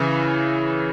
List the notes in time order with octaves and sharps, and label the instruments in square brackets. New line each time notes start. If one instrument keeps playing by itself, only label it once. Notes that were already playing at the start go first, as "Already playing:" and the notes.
Already playing: [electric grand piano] C#3 E3